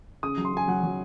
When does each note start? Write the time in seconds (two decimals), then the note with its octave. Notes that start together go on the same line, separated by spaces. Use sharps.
0.23 C#3 D#6
0.37 F#3
0.45 C6
0.53 C#3 G#5
0.68 F#3 F#5
0.83 F#3